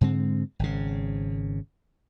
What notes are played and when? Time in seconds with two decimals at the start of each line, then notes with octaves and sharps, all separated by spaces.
0.01 G#2 D3 G#3 C4
0.59 G#1 C#3